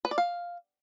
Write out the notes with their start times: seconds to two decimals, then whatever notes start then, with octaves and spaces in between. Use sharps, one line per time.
0.05 B4
0.11 D5
0.18 F5